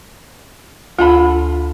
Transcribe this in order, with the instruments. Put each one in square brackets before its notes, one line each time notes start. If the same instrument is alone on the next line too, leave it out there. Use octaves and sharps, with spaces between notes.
[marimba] D2 [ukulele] F4 A4 B5